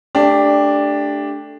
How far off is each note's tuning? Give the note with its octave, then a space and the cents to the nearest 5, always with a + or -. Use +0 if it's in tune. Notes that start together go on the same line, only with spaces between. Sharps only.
A3 +0 D4 +0 G4 +20